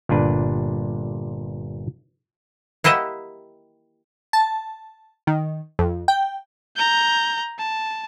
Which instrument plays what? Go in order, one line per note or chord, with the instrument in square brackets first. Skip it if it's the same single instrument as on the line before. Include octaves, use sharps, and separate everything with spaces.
[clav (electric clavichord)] G1 A#2 D4 B4
[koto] A#3 E4 G4 D#5 E5 F#5
[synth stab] A5
D#3
F2
G5
[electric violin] A#5 G6
A5